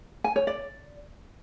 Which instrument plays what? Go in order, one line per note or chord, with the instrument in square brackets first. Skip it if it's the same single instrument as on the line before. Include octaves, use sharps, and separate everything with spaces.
[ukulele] G#5
C#5
D5